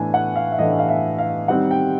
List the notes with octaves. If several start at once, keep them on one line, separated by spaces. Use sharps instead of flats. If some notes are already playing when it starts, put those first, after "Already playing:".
Already playing: A2 E3 A3 D4 G#5
F#5
F5
E5
A2 E3 A3 D4 D#5
F5
E5
F5
D#3 G3 C4 D#4 F#5
G5